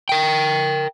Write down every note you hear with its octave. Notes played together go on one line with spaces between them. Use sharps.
A#4 G5